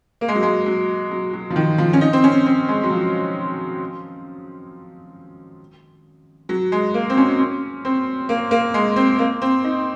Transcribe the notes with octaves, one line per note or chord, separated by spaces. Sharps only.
A#3
G#3
F#3
G#3
F#3
F#3
F#3
F3
D#3
F3
C#4
D#4
C4
C#4
C4
G#3
F#3
F3
F#3
G#3
A#3
C4
C#4
C#4
C4
A#3
A#3
G#3
C4
A#3
C4
D#4